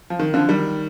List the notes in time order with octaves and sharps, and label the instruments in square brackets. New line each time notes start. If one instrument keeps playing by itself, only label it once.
[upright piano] F3
D#3
D3 F3
D#3 G3